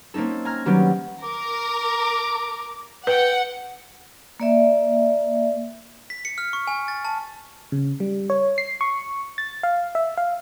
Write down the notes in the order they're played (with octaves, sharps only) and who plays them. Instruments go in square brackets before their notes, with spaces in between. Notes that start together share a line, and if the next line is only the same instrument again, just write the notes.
[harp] A#3 C4 C#4 D#4 A4
G#5 A#5 F6 G#6
D#3 F#3 G3 B3 C#4 G4
[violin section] A#4 [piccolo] D6
[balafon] B4 [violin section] F#5 [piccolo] G5
[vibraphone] A#3 D5 E5
[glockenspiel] B6
C#7
F6
C#6
G#5
A6
A5
[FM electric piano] C#3
G3
C#5
C7
C#6
A6
F5
E5
F5